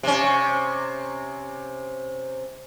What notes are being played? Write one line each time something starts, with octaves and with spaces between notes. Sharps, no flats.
C3 C#4